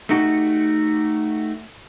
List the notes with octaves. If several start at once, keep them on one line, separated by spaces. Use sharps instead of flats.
A3 D#4 F#4 G4